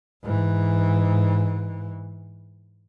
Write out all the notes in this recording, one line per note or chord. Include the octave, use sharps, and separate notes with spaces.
G#2 E3